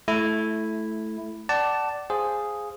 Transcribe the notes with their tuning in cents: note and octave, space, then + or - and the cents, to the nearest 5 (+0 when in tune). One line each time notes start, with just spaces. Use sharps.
A3 -15 E4 +0
D5 +0 F#5 +30 A5 +0
G#4 +0 C5 +0 F5 +0